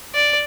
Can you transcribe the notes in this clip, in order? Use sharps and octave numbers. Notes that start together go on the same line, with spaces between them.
D5